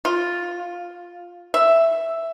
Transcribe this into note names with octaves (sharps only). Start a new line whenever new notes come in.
F4
E5